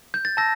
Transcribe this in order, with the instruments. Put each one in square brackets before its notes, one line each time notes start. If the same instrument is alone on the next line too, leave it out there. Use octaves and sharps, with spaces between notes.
[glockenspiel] G6
A6
A5 E6 G6 A#6